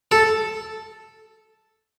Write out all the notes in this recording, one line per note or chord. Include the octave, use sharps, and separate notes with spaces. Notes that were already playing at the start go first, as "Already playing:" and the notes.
A4